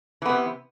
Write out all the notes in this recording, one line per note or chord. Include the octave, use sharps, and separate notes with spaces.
C3 E3 B3